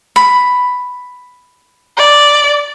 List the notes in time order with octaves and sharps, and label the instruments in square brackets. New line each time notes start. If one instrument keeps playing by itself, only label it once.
[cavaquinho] B5
[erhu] D5